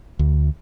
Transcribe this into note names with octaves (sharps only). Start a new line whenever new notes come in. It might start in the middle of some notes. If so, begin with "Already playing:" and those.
D2